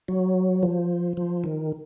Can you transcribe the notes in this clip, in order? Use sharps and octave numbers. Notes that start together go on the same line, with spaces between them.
F#3
F3
F3
D#3